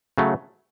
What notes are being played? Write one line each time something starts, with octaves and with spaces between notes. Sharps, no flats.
C#3 F#3 A3